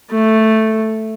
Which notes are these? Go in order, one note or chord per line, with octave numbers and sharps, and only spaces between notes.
A3